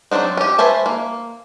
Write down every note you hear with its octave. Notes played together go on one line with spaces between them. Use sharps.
F#3 G3 C4 D4 D#4
C#4 G4
B4 C5 E5 G#5 A5
A#3